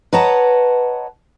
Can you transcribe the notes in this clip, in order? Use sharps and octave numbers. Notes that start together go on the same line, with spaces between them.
B4 C#5 D#5 F#5 A5 A#5